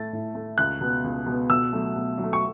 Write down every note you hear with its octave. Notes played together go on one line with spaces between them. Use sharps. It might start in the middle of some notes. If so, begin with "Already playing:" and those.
Already playing: A2 A3 A6
A2
A3
C#2 F#6
B2 B3
C#2
B2 B3
B2 E6
F#3 A3
B2
F#3
A3
C#6